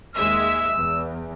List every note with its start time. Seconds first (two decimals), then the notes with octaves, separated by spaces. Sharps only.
0.16 D#2 G#3 E5 E6
0.76 E2